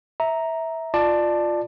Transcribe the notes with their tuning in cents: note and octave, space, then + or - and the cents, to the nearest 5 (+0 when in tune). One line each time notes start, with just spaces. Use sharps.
E5 -15 A#5 +0
F4 +0 D5 +20 A5 +0